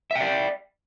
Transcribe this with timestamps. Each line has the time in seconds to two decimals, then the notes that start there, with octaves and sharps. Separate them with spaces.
0.11 E5
0.15 G5
0.20 D5